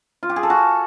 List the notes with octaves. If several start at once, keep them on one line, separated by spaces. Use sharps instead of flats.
F4
G4
G#4
A4
F#4